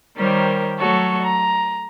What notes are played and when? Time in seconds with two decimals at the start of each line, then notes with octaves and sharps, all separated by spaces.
0.17 D#3 G3 G4 A#4 C5 C#5
0.78 F#3 A3 F#4 A4 C#5
1.22 A#5